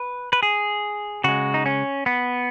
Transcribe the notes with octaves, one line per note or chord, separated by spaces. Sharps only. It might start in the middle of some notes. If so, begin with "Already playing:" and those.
Already playing: B4
B4
G#4
C#3 G#3 F#4
D#4
C#4
B3